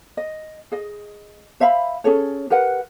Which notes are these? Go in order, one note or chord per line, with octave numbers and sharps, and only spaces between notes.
D#5
G#4 D#5
C5 E5 F5 B5
C#4 G#4 A4 C#5
G4 A#4 B4 F#5